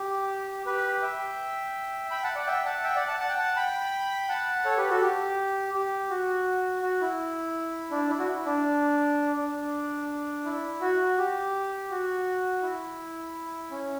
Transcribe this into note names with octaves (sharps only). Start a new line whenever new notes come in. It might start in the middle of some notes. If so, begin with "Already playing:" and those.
Already playing: G4
G4 B4
E5 G5
G5 B5
F#5 A5
D5 F#5
E5 G5
F#5 A5
E5 G5
D5 F#5
F#5 A5
F#5 A5
G5
F#5 A5
G5 B5
F#5 A5
A4 C#5
G4 B4
F#4 A4
G4
G4
F#4
F#4
E4
D4
E4
F#4
E4
D4
D4
E4
F#4
G4
F#4
E4
C#4